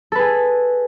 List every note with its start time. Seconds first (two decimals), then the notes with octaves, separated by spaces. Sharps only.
0.12 A4
0.15 B4
0.19 G#4